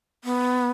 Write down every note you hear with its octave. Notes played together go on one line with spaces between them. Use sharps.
B3